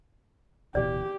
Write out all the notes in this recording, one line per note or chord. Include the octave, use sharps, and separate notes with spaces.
D1 B2 E3 G4 D5